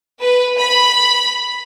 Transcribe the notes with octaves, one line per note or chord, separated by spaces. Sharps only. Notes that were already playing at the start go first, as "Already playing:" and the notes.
B4
B5